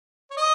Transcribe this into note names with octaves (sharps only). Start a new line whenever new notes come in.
C#5
D#5